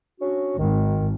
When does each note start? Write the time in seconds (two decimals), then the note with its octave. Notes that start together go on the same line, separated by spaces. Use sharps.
0.20 C#4 D4 F#4
0.58 G#1 D#3